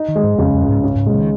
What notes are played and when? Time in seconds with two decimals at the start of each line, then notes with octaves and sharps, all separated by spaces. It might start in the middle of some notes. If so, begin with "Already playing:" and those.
Already playing: D#4
0.08 D#3
0.16 G#3
0.23 G#2
0.38 F2 C#3
0.54 F2
0.62 C#2
0.69 G#2
0.83 G#2 C#4
0.95 G#2
1.06 A#2 G#3
1.14 F3
1.18 D#3